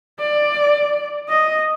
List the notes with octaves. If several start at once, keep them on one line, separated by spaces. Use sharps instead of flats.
D5
D#5